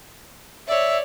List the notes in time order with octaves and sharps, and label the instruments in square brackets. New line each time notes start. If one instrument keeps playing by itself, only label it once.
[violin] C#5 D5 [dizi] E5